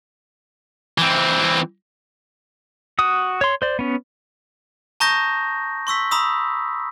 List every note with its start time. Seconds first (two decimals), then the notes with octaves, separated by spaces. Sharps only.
0.98 E3 C4
2.99 F#4 D#6
3.41 C#5 C6
3.62 C5 D5
3.79 B3 C#4
5.00 A5 A#5 C#6 D#6 G6 A#6
5.87 C6 C#6 E6 B6
6.11 A#5 B5 D#6 E6